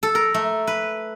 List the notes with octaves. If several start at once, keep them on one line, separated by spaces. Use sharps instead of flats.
A4
A#4
A3
B4